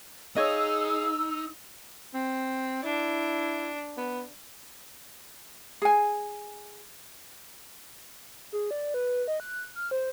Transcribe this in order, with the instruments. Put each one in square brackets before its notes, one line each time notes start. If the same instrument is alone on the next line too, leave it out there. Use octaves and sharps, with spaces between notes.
[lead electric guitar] D#4 [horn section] G#4 F5 [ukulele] C#5 D#5 [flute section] E6
[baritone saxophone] C4
[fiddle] D4 [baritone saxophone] E4
[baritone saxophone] B3
[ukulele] G#4 G#5
[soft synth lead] G#4
D5
B4
D#5
F#6
F6
C5